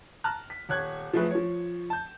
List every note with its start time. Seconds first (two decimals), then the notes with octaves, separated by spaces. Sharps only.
0.24 A5 A#5 F6 F#6
0.50 B6
0.69 D#1 C#5 F#6 G#6
1.13 F3 F#3 A3 G#4 B4
1.31 F3 C#5
1.90 A5 G6